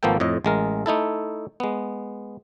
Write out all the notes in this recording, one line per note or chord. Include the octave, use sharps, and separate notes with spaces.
G#1 F3 A#3 B3 A4 G5
F2 A2 D#5
A1 G#3 A#4
A3 D#4 E4 A4
G#3 B3